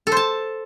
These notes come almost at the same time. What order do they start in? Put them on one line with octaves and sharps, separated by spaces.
A4 C5 A5